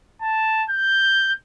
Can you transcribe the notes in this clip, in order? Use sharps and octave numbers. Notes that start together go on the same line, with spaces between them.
A5
G6